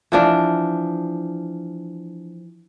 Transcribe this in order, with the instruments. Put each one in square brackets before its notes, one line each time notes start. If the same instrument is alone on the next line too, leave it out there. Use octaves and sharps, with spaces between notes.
[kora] E3 F3 D4